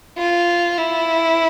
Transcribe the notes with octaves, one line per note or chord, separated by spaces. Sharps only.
F4
E4